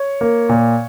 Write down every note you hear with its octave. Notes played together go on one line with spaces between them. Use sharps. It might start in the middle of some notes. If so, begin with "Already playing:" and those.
Already playing: C#5
A#3
A#2